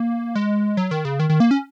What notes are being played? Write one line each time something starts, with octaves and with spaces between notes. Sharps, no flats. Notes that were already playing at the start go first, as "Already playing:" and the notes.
Already playing: A#3
G#3
F#3
D#3
C#3
D#3
D#3
A#3
C#4